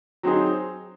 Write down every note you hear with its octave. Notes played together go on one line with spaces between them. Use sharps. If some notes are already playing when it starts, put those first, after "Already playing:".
F#3 C4 D#4 G#4